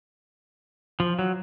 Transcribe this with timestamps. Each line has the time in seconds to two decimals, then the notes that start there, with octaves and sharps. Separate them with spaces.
1.00 F3
1.19 F#3